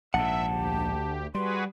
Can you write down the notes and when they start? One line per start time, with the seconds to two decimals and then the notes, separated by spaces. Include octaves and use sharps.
0.14 A#1 G#2 E5 F#5 A5
0.49 D2 G4
1.35 G3 F#4 G#4 B4 C6